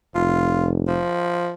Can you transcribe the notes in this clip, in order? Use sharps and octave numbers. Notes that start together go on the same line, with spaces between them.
F1 F4
F3